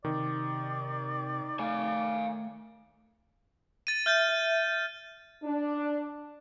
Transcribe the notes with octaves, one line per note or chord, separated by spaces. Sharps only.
C3 D#3 D5
A3 F5 G#5
A6 D#7
E5 F6 G6 A6
E5
D4